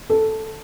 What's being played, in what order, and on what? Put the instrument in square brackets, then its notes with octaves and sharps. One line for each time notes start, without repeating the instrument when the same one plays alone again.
[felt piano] A4